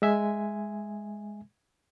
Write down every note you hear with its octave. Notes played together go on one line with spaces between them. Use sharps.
G#3 E5 G#5